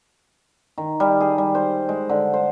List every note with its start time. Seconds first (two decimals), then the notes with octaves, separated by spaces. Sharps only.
0.78 D#3
1.00 G3
1.21 G#4
1.38 G3
1.55 C5
1.89 G#3
2.09 D3
2.34 C5